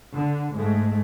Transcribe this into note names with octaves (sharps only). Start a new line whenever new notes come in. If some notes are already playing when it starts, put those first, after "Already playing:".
D3
G#2 G#3 A3